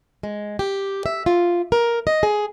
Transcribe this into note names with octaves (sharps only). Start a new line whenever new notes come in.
G#3
G4
E5
F4
A#4
D#5
G#4